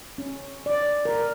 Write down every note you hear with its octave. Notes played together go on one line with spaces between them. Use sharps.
C#4
D5
A#4